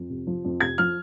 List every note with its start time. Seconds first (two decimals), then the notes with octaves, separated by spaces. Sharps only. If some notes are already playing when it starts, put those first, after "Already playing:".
Already playing: F2
0.10 C3
0.27 F3
0.45 F2
0.60 C3 G#6
0.78 F3 F6